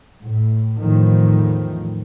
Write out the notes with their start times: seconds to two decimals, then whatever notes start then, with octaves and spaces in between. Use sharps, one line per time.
0.23 A2
0.80 E2 A2 D#3 F3